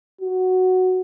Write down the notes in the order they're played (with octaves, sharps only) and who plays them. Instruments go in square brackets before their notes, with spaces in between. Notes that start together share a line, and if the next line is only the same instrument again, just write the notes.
[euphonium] F#4